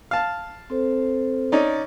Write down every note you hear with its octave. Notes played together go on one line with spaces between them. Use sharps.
F5 A5
C4 A4 C5
C#4 D#4 D5